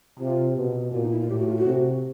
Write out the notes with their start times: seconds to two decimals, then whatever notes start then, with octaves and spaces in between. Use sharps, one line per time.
0.19 C3 F4
0.56 B2
0.92 A#2 F4
1.02 D#4
1.11 E4
1.20 F4
1.29 A2 G4
1.38 F#4
1.47 F4
1.55 F#4
1.65 C3